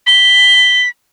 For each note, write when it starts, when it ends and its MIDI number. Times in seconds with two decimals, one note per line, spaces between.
0.06 0.89 95
0.06 0.80 103